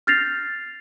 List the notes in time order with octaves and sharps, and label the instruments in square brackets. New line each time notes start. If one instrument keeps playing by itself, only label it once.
[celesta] F6 G6 A6 A#6 C7 F7